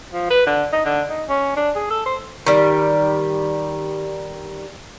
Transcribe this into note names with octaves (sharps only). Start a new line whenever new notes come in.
F3
B4
D3
D#4
D3
D#4
C#4
D4
G#4
A4
C5
D#3 G3